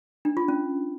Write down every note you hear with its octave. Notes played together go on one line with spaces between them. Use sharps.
D4
F4
C#4